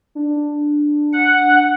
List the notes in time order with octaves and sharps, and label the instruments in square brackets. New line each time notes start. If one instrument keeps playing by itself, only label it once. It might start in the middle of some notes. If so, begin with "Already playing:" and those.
[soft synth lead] D4
[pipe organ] F#5